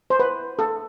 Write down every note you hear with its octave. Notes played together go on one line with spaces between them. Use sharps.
C5
B4
A4